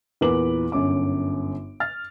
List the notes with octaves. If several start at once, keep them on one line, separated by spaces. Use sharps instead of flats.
E2 A#2 A#4 B4 D6 F#7
G1 F#2 C#4 D6
F6 A6